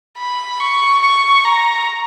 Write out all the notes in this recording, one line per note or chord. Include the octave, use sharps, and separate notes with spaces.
B5
C#6
C#6
A#5